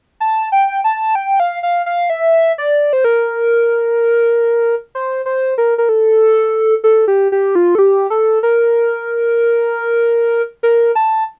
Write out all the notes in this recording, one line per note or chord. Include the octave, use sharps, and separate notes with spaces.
A5
G5
A5
G5
F5
F5
F5
E5
D5
C5
A#4
C5
C5
A#4
A#4
A4
A4
G4
G4
F4
A4
G4
A4
A#4
A#4
A5